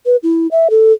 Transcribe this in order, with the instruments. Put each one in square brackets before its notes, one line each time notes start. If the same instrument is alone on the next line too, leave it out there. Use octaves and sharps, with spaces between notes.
[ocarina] B4
E4
E5
A4